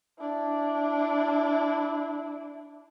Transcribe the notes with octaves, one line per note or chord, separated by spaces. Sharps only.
D4 E4